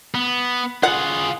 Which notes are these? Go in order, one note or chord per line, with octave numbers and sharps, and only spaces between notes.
B3
F4 G#4 F#5